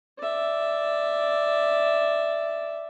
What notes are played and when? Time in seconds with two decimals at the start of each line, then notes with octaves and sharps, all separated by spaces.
0.19 D5 E5